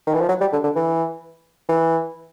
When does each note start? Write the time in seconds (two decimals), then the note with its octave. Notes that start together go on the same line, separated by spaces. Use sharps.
0.07 D#3
0.14 E3
0.21 F3
0.29 F#3
0.40 G3
0.52 D3
0.63 D3
0.76 E3
1.69 E3